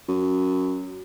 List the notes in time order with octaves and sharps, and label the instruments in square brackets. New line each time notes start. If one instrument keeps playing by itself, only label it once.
[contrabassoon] F#2